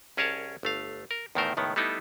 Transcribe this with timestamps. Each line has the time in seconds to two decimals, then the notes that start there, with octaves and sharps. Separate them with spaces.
0.17 C2 C#4 G#4 A#4 C#5 A5
0.63 G1 A3 F5
1.11 A#4
1.35 E2 A2 D#3 A3 A#4 C5
1.57 C#2 A2 D#3 B3
1.76 G3 A3 B3 D#4 E4 A4